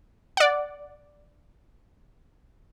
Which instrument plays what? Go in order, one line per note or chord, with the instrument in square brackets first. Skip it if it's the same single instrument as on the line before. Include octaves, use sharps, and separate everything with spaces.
[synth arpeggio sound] D5 F#5